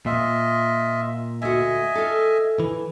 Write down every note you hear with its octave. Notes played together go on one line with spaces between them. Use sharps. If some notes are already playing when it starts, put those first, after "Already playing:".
A#2 F4 D#5 E5
D2 F#4 D#5 E5 G#5
F4 A4
E3